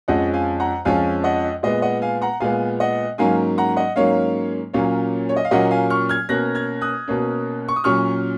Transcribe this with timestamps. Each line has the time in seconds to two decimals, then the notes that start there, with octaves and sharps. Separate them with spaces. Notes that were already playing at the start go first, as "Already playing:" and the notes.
0.08 F2 F3 G#3 C#4 D#5 F#5
0.34 F5 G#5
0.60 F#5 A#5
0.85 F2 F3 G#3 C#4 F5 G#5
1.24 D#5 F#5
1.63 A#2 G#3 B3 D#5
1.82 D#5 F#5
2.02 F5 G#5
2.22 F#5 A#5
2.40 A#2 G#3 B3 F5 G#5
2.80 D#5 F#5
3.18 G#2 F#3 A#3 C#4 F5 G#5
3.58 F#5 A#5
3.76 D#5 F#5
3.96 G#2 F#3 A#3 C#4 C#5 F5
4.73 A#2 F#3 A#3 C#4 C#5 F5
5.29 C#5
5.36 D#5
5.45 F5
5.51 A#2 F#3 A#3 C#4 D#5 F#5
5.71 F5 G#5
5.90 C#6 F6
6.09 F6 G#6
6.29 B2 A#3 C#4 F#6 A#6
6.55 F6 G#6
6.81 D#6 F#6
7.08 B2 A#3 C#4
7.68 C#6
7.76 D#6
7.84 A#2 F#3 C#4 C#6 F6